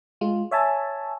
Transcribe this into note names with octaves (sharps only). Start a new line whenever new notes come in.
G#3 F4
C#5 E5 G#5 A5